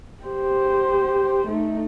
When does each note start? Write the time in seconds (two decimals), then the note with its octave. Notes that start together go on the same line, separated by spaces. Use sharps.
0.23 G4 C5
1.48 A3 D#4